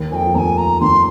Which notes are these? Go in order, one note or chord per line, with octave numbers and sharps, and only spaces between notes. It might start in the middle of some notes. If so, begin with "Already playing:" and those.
Already playing: D#2 D#3
F2 F3 G5 G#5
F3
D#2 D#3 G#5 A#5
A#5
D#2 D#3 C6